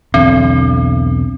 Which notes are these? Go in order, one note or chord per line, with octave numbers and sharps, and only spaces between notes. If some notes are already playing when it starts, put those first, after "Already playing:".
B1 E2 D3 C4